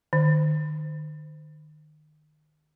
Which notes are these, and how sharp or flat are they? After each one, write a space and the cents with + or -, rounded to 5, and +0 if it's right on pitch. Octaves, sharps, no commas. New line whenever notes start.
D#3 -35